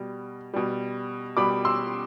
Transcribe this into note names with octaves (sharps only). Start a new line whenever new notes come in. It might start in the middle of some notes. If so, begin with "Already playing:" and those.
Already playing: B2 G3
B2 G3
B2 G3 B5 D6
C6 E6